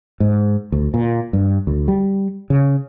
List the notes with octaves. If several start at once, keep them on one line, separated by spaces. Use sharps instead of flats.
G#2
D2
A#2
G2
D2
G3
C#3